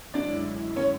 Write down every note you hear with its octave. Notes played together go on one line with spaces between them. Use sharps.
F#2 D3 G#3 C#4 D4 E4 D5
C#4 C#5